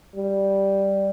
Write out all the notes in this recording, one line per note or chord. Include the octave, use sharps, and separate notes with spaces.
G3